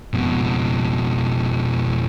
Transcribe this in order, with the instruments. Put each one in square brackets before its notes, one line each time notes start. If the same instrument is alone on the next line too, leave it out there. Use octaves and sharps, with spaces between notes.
[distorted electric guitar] F2 B2